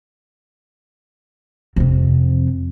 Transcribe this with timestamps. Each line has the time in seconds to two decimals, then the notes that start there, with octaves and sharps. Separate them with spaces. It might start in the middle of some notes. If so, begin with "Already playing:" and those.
1.76 F2 C3